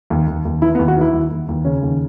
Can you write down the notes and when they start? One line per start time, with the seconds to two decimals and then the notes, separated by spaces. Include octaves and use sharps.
0.10 D#2
0.27 D#2
0.45 D#2
0.62 E3 E4
0.75 B3
0.79 D#2
0.88 F#4
0.97 E3 E4
1.14 D#2
1.31 D#2
1.48 D#2
1.65 C#3 C#4
1.83 D#2